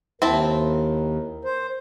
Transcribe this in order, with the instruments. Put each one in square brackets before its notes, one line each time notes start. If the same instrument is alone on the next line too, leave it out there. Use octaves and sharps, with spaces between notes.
[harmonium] D#2 [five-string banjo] C4 E4 A5 [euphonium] A#4
[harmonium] C5